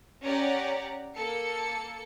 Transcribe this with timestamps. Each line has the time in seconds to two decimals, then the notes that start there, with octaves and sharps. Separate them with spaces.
0.23 C#4 G4 C#5 D5 F#5 A#5
1.17 A#3 A4 C#7